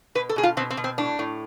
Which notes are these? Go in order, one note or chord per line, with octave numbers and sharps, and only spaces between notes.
B2 B4
A4
B2 G#4
F4
B2 C4
C4
B2
C4
A2 D4
A2